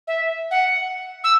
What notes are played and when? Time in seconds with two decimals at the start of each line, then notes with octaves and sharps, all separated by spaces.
0.08 E5
0.51 F#5
1.24 E6